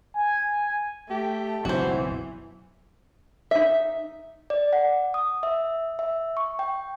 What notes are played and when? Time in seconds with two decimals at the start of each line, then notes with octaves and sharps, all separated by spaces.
0.16 G#5
1.10 A3 G4
1.65 F#1 B1 E3 C4 F#4 C5
3.51 D#4 E5
4.50 D5
4.73 F#5
5.14 D#6
5.43 E5
5.99 E5
6.37 C#6
6.59 G5